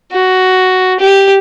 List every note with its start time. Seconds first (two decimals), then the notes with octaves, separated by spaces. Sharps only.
0.12 F#4
1.00 G4